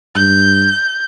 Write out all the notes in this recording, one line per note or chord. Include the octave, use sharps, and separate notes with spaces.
G2 G6